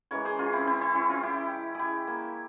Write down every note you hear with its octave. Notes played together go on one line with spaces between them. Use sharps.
C#3 E3 G#3 A#4 C#5
G#4 C5
C#4 F4
C4 E4
C4 E4
C4 E4
C4 E4
C#4 F4
E4 G4
E4 G4 G#4
A#3